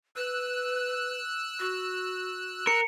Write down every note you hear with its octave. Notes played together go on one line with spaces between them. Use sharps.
B4 E6 F#6
F#4
A#4 C#7